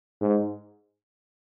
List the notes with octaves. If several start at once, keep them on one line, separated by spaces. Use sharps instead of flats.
G#2